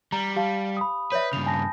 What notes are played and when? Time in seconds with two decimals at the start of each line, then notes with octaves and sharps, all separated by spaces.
0.12 G3 A#5
0.36 G4 F5 A5
0.77 B5 D#6
1.12 B4 C#5 D5 E5 G6
1.33 G2 C#3 F7
1.46 G#5 A5 A#6